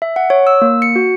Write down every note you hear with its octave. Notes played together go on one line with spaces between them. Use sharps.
E5
F#5
C#5
E6
A#3
C#7
F#4